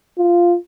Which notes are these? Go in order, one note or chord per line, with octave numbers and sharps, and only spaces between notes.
F4